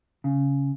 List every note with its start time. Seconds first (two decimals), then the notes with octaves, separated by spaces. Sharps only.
0.24 C#3